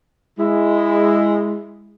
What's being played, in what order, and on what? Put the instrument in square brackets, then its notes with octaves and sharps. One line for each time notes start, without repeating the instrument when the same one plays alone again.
[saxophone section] G#3 E4